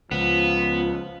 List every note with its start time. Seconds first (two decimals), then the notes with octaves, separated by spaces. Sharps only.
0.11 C#2 F3 B3